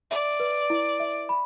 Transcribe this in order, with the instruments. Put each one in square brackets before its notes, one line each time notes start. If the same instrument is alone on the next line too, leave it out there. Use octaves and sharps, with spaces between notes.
[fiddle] D5 [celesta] E5
[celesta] B4
E4
E5
B5